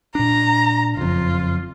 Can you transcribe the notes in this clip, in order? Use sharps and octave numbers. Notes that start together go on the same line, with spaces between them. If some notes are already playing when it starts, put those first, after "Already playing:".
A#2 D4 A#5
F#1 F2 F4